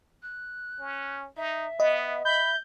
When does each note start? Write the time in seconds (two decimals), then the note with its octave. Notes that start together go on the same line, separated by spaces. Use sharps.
0.23 F#6
0.80 C#4
1.37 D#4 E5
1.80 B3 D#5
2.25 E5 B5 G6